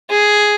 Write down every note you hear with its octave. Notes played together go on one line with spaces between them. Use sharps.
G#4